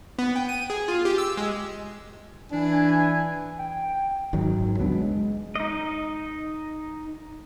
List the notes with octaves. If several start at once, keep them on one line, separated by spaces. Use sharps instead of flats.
B3
G5
D#7
G#4
F4
G4
E6
G#3
E3 D4 G#5
G5
G#1 F#2 D#3 F#3
C#2 F#3 B3 D4
G#3
D#4 D#5